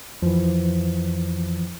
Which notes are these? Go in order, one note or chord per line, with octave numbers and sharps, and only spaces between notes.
F2 E3 F3